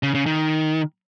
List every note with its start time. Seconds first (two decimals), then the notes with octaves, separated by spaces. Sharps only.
0.03 C#3
0.15 C#3
0.26 D#3